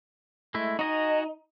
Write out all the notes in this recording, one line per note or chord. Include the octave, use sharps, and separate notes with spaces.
G#3 A3 E4
D#4 F#4 D#5 G#5